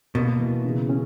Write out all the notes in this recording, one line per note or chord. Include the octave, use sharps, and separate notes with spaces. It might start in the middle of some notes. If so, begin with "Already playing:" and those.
B2 A#3
E3
C#3
C#4